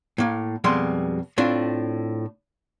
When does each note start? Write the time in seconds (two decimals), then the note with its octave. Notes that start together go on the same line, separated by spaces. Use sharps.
0.18 A2 A#3
0.64 F2 B2 G3 G#3 C6
1.38 A2 C4 D4 F4